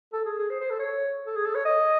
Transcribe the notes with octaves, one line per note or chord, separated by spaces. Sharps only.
A4
G#4
G#4
C5
C5
A4
C#5
A4
G#4
A4
C#5
D#5